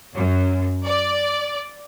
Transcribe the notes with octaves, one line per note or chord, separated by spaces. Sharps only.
F#2
D5